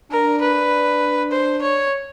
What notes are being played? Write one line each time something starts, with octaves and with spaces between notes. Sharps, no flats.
D4 A#4
B4
C5
C#5